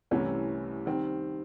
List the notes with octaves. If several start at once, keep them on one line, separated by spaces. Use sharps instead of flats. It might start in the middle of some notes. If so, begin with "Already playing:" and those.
C2 C3 E3 A3 C#4
D#3 G3 C4